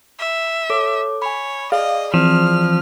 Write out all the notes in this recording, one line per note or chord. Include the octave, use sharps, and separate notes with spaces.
E5
A4 C#5 D6
C#5 G#5 B5
G#4 D5 D#5 F5
E3 F3 C4 F6